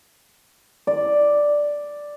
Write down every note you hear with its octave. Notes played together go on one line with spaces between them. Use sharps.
D5